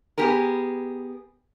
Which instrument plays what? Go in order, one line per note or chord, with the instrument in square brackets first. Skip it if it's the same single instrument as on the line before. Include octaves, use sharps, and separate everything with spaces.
[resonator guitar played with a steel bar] B3 G4 G#4 A#4